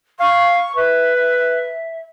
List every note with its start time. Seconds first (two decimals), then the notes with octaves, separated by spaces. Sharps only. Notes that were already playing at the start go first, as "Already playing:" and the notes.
0.20 F5 C#6
0.76 B4 E5